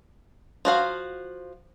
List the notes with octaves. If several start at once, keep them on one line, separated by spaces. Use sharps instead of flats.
F3 F#4 F5